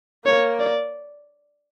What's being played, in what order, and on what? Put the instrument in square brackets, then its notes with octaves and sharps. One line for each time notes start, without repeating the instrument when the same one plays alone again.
[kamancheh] A#3 [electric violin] C#5
[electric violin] D5